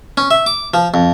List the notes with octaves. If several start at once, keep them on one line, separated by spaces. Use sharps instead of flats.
C#4
E5
D6
F3
F2